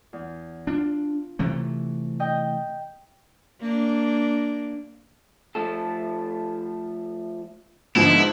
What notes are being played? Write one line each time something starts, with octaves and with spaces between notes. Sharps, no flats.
E2
D4 F4
C3 E3 A3
D#5 G5
A#3 D4
F3 A3 A4
G#2 D3 D#3 F3 G#3 B3 E4